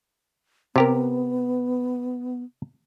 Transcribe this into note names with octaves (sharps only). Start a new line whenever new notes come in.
C3 B3 G4 A#4